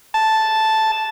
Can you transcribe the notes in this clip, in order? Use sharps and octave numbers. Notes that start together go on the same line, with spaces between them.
A5